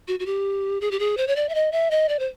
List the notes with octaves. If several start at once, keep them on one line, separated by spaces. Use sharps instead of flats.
F#4
F#4
G4
G#4
G4
G#4
C5
C#5
D5
E5
D#5
E5
D#5
D5
C5